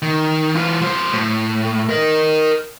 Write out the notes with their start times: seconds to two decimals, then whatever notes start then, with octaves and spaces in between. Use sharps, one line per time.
0.02 D#3
0.55 E3 F4
0.82 F#3 C5
1.13 A2
1.89 A#4 D#5